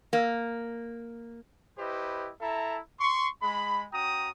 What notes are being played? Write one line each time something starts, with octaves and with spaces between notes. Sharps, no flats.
A#3
E4 G4 B4 C5 D#5
E4 A4 E5 A5 A#5
C6 C#6
G#3 B5
C#4 F#4 G5 A#5 D#6